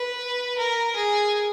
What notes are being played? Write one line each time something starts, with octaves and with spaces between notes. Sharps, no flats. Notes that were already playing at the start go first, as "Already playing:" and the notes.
Already playing: B4
A#4
G#4